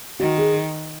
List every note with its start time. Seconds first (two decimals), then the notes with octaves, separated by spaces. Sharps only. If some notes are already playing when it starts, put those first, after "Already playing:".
0.20 D#3 F#4
0.38 G#4